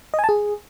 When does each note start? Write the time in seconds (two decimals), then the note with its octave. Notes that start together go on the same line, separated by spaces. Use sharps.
0.14 D#5
0.19 G#5
0.24 A5
0.29 G#4